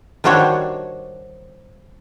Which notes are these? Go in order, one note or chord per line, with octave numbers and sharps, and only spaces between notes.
D#3 G3 D4 F#4 C5 C#5